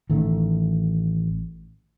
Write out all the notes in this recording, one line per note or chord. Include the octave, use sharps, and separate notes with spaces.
A1 D#3 A3